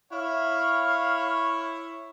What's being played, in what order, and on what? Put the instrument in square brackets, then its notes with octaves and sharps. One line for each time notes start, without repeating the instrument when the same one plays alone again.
[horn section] E4 C#5 [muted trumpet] F5